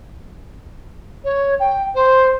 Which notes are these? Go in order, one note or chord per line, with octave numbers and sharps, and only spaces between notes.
C#5
G5
C5